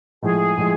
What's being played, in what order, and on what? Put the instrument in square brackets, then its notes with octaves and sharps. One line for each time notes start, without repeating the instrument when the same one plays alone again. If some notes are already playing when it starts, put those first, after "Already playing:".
[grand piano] A2 F3 G#3 [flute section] G#4
[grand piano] A2 F3 G#3